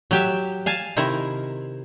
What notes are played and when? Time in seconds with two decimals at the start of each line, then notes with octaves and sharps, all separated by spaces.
0.11 F#3 G4 E5
0.66 F5 G#5 A5
0.97 C3 D#3 E4 A#4